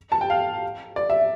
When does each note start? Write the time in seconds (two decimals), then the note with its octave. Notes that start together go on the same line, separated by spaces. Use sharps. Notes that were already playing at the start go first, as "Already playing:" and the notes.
0.12 A5
0.21 G5
0.30 F5
0.96 D5
1.10 E5